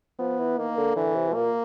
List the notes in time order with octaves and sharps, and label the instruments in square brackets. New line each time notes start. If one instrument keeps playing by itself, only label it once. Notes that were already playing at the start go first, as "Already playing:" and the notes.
[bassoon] F3 [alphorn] B3
[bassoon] E3
[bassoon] D#3 [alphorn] A#3
[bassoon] D3
[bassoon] D3 [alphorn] E3
[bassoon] C3
B2
[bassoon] A#2 [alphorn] A#3